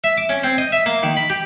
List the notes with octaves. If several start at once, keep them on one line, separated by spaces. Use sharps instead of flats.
E5
D6
C#4
C4
D#5
E5
A#3
D#3
B5
G4